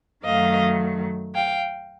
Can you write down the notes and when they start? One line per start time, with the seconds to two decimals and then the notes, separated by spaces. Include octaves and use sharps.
0.24 F#2 D#3 F#3 A3 D#5 F5
1.35 F5 G5